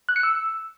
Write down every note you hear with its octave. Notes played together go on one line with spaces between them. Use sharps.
F#6
C#7
E6